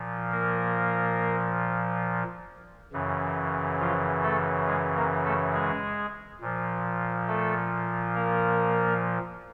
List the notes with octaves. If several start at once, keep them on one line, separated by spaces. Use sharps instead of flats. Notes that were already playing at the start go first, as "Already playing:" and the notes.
Already playing: A#2 F3
A#3 A#4
F#2 C#3 E3
F3 F4
A3 A4
G#3 G#4
A#3 A#4
A3 A4
G#3 G#4
A#2 F3
A3 A4
A#3 A#4